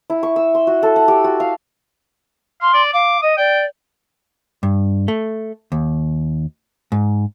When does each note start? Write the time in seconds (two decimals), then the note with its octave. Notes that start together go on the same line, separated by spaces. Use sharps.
0.10 E4
0.23 C#6
0.36 E6
0.55 C6
0.67 F#4
0.83 A4
0.96 F#5
1.08 G4
1.24 F#4
1.40 F5
2.61 F5 C6
2.74 D5
2.93 F5 D6
3.22 D#5 D#6
3.37 D5 G5
4.63 G2
5.08 A3
5.72 D#2
6.92 G#2